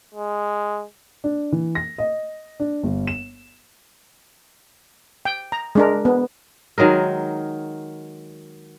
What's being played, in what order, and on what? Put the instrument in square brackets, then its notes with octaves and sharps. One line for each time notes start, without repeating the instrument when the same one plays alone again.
[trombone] G#3
[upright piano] D4
E3
A#6
D#5
D4
G1
E7
[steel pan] G5
A#5
G#3 D4 A#4
B3
[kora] D#3 F#3 G#3 A#4